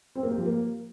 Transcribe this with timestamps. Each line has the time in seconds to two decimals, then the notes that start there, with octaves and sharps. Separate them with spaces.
0.15 C4
0.23 A#3
0.31 G4
0.38 F3
0.46 A#3